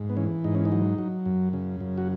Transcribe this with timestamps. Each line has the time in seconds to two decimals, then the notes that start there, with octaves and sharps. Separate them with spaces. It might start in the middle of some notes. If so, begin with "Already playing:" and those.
Already playing: G#2
0.10 B3
0.17 E3 C#4
0.44 G#2 D#4
0.55 C#4
0.65 D#4
0.72 F#3
0.98 F#3
1.26 F#2
1.53 C#3
1.81 F#2
1.98 F#4